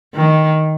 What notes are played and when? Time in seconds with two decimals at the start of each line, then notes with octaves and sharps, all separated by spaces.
0.14 D#3